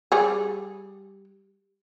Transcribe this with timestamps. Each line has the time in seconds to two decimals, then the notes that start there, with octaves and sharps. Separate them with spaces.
0.12 G3 G#4